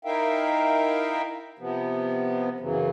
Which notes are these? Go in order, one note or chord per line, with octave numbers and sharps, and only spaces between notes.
D#4 E4 A#4 E5 F5 G5
C3 F3 B3
F#2 C#3 E3 F#3